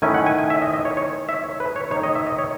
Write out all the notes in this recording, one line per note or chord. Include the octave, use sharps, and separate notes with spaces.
D#3 A3 C#4 E4 G#5
F#5
G#5
G#5
E5
D#5
D#5
C#5
C#5
E5
C#5
B4
C#5
D#3 A3 D#4 C#5
D#5
E5
D#5
C#5